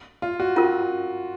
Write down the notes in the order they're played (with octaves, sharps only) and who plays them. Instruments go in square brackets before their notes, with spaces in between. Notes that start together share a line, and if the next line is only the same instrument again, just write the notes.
[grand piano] F4
F#4
[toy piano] C#4 F4 A#4